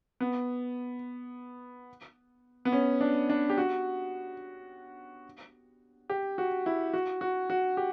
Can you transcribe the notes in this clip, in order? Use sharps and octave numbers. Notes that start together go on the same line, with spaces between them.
B3
B3
C#4
D4
D4
G4
F#4
G4
F#4
E4
F#4
F#4
F#4
G4